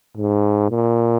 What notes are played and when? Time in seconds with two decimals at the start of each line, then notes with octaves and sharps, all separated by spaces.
0.17 G#2
0.70 A#2